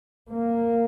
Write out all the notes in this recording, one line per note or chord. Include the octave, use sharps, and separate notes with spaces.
A#3